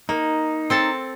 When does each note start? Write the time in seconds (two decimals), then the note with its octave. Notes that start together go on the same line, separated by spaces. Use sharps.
0.09 A#3 D#4
0.70 C4 A4 A5